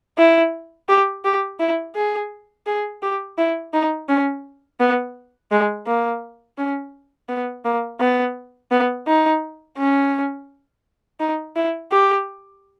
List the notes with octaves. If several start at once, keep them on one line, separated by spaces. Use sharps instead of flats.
E4
G4
G4
E4
G#4
G#4
G4
E4
D#4
C#4
B3
G#3
A#3
C#4
B3
A#3
B3
B3
D#4
C#4
D#4
E4
G4